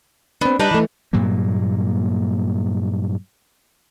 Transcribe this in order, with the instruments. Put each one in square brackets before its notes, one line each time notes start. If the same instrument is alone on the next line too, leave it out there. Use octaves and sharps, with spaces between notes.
[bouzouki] B3 [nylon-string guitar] C4 D4
[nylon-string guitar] G3 [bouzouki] D4 D#4 B4
[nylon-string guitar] E3 A3
[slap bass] G2 A#2 F#3 A#3